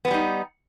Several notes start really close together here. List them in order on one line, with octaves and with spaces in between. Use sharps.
B3 G#3 G3 D#4